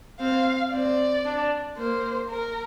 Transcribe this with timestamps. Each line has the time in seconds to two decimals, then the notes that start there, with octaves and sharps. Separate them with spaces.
0.20 C4 F5
0.72 C4 D5
1.25 D4
1.77 A#3 C5
2.30 A#4